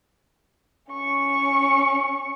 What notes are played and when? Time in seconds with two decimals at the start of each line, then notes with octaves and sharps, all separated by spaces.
0.91 C#4 C#6